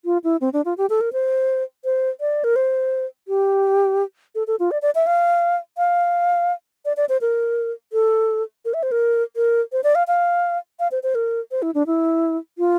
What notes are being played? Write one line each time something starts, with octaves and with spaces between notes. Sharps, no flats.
F4
E4
C4
D4
F4
G4
A4
A#4
C5
C5
D5
A#4
C5
G4
A4
A4
F4
D5
D5
E5
F5
F5
D5
D5
C5
A#4
A4
A#4
E5
C5
A#4
A#4
C5
D5
F5
F5
F5
C5
C5
A#4
C5
E4
D4
E4
F4